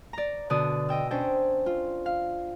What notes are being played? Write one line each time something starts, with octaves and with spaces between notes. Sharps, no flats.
D5 A#5
B2 D3 D5 D#6
D#5 G5 E6
C#4 D4 C5 G5
F4
F5